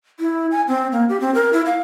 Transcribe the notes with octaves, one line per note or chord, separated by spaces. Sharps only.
E4
G#5
C4
A#3
G4
C4
A#4
E4
F5